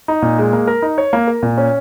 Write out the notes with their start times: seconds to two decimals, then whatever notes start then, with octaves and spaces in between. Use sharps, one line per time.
0.08 D#4
0.22 A#2
0.38 G#3
0.53 A#3
0.68 A#4
0.82 D#4
0.98 C#5
1.13 A#3
1.27 A#4
1.43 A#2
1.58 C#4